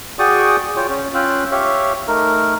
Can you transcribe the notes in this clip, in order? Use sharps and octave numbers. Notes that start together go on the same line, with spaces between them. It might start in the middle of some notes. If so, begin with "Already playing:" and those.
F#4 G#4 D5 G5 C#6 D#6
F4 C#5 G5
C#4
C#4 F4 F5 G5 E6 F#6
G4 C#5 E5 F5
A3 D#4 A#4